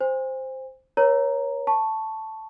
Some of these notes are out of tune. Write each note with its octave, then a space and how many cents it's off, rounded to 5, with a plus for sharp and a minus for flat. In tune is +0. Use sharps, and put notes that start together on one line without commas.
C5 +0 G#5 -40
A#4 +45 C#5 +0 A#5 +0
A5 +0 C#6 +0